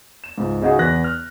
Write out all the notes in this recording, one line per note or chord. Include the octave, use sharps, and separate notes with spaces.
E7
C#2 G#2
C#3 D#4 F#4 G#4
E2 B3 B4 F#6 A#6
F6